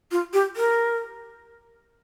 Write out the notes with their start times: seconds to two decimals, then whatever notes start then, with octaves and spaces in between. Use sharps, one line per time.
0.11 F4
0.33 G4
0.56 A#4